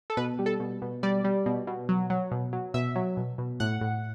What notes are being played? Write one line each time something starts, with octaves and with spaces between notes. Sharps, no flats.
A4
B2 B4
G3
A4
B2
B2
G3 D5
G3
B2
B2
F#3
F#3
B2
F#3
B2 E5
F#3
B2
B2
A2 F#5
A2